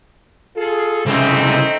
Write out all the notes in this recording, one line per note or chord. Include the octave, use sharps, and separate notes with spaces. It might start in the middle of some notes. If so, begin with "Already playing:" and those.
F4 G#4 A4
C2 C#3 A3 C4 D#4